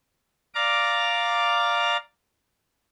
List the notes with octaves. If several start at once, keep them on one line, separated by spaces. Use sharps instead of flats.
D5 F5 A#5 D6